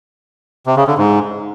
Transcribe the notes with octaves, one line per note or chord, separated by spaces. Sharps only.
C3
C#3
D3
G#2